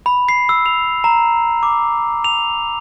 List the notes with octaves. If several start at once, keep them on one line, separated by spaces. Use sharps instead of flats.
B5
C7
E6
F7
A#5
D6
F7